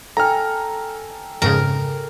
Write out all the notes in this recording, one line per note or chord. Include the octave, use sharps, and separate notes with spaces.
A4 G5 G#5 A#5 F6
F2 G#2 C#3 A#4